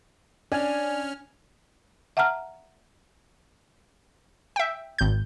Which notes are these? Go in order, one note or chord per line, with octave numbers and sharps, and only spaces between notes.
C#4 D4 G#5 F6
E5 F#5 A5 A#5 F6
E5 G5
G#1 G6